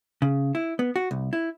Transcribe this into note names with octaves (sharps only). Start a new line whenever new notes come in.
C#3
E4
B3
F#4
C2
E4